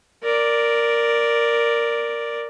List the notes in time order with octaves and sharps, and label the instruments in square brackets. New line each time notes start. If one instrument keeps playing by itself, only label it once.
[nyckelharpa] A#4 D5